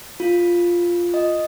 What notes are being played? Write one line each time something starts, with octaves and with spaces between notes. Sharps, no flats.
F4
D#5